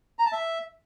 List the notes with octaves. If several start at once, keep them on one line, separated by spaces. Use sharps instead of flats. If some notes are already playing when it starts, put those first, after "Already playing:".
A#5
A5
E5